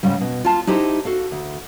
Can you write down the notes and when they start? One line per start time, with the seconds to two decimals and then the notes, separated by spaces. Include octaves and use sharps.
0.03 G#2 C#3 G3
0.21 B2
0.45 F4 A5
0.67 D#4 E4 G4 C5
1.05 F#4 A4 F5
1.32 D2